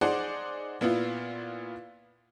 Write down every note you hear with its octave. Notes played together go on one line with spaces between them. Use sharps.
D#4 G#4 C5 D5 F#5
A#2 B3 E4 F4